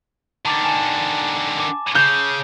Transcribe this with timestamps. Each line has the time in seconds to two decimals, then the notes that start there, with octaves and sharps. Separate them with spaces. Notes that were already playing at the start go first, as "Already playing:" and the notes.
0.45 D3 D#3 A5 D6 A6
0.64 G#5 A5 E7
1.60 D6
1.95 C#3 G6 C7